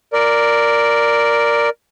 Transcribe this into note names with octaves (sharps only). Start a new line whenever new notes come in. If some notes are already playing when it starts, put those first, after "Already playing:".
A#4 D5